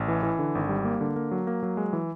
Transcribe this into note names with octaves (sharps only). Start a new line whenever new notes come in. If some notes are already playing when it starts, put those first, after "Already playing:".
Already playing: A1
E3
E3
D3
G#1
G3
A#3
D3
A#3
F#3
A#3
F#3
G#3
E3